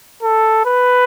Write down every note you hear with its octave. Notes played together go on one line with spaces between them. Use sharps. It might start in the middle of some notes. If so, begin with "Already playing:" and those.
A4
B4